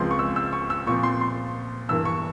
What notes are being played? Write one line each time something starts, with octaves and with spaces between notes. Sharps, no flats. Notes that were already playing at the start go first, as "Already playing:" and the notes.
Already playing: C#2 C#3 F3 G#3 C4 C6
C#6
E6
E6
C#6
E6
A#2 F3 C4 C#6
C6
C6
G2 E3 A#3 E6
C#6